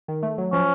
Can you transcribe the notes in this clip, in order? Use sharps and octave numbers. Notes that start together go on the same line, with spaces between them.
D#3
A3
F#3
F3 C#4